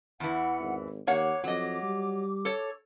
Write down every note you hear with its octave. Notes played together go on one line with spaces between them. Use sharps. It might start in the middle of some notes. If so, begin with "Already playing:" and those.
E2 E3 E4 F#5
G#1
D#2 A#3 C#5 F#5 D6
F2 F#3 D#5
G3
A4 C#5